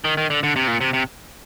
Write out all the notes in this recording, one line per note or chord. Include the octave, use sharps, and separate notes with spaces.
D#3
D#3
D3
D3
C3
A#2
C3
C3